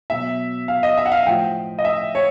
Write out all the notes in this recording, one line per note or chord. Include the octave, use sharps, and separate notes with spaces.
B2 F#3 E5
F5
D#5
E5
F#5
F5
A2 F3 G5
D#5
E5
C#5